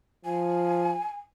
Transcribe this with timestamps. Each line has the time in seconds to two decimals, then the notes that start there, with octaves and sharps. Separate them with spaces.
0.25 F3 G#5